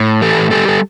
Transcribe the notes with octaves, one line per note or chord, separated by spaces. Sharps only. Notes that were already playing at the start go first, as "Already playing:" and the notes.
Already playing: A2
E3 G4 A4
G3 G4 A4
A4